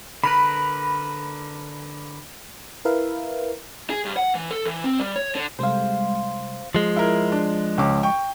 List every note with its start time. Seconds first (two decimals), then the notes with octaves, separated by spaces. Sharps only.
0.24 D3 A#4 B4 B5
2.85 E4 A#4 B4 E5 F5
3.90 G#4
4.05 G2
4.17 F#5
4.35 E3
4.51 A4
4.65 E3
4.84 C4
5.00 G3
5.16 C#5
5.35 D3
5.59 C3 G3 G#3 C5 F5
6.75 F3 G#3
6.96 E4 A#4
7.32 D4
7.78 C#2 C#4 D6
8.03 G5 C#6